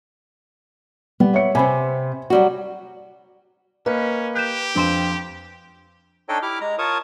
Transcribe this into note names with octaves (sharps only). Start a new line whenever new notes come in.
G3 B3
C#5 E5 C#7
C3 C4 G#5 B5
F#3 G3 F#4
A#3 C#4 B4 D#5
G4 F#6 G6 E7
F2 C4 D4 F4 C6 E7
D4 D#4 A4 C#5 D#5 G5
E4 G4 D6 F6
G#3 A#5
F4 A#4 C#5 A5 C#6 D#6